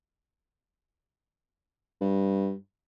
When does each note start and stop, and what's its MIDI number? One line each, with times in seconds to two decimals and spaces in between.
2.01 2.53 43